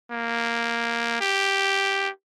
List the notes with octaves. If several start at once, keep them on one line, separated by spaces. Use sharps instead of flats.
A#3
G4